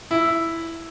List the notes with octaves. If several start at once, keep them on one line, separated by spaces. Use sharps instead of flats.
E4